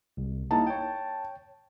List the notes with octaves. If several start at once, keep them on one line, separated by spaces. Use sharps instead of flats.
C2
A#3 D#4 E4 A5
C#5 G5